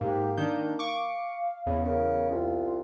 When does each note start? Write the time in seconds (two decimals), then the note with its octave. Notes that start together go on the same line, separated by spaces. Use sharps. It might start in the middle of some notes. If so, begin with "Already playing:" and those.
0.01 G#2 A#3 G4
0.37 D#3 D4 G6
0.79 F5 C#6 D6
1.66 E2 C#3
1.85 C#3 A#4
2.31 C2 F4